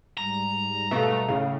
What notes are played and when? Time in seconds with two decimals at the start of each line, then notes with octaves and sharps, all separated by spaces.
0.17 G#2 G3 A#5
0.91 B2 A3 F5
1.28 A2 C#3 F5